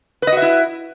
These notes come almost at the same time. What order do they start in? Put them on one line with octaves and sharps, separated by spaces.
B4 D#5 F#4 E5 E4